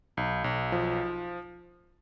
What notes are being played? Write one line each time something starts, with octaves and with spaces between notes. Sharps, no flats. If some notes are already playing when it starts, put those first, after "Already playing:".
B1
B1
F3